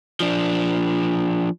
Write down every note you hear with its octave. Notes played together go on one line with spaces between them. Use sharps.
F3 D4